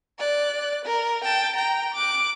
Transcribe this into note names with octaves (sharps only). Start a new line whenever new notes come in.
D5 F#6
A#4
G5 A5
G5 A#5
D6 F#6